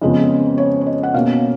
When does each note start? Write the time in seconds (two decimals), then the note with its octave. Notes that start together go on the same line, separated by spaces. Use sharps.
0.02 F2 C#3 G#3 B3 D#5
0.58 C#5
0.81 C#5
0.86 D#5
1.03 F#5
1.14 B2 A#3 C#4 F5